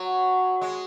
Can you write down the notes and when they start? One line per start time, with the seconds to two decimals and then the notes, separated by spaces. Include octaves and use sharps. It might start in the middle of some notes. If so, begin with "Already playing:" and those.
Already playing: F#3
0.61 G#3